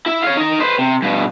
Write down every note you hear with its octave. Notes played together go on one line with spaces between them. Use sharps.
E4
C#5 F5
D#4 A#4
B4 C5
C3
G2 B2